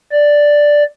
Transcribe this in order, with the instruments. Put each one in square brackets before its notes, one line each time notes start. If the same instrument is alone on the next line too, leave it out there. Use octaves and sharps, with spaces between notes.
[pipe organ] D5